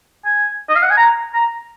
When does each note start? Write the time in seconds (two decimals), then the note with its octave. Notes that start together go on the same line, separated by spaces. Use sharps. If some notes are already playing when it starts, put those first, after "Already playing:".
0.25 G#5
0.69 D#5
0.76 F5
0.82 F#5
0.90 G#5
0.97 A#5
1.34 A#5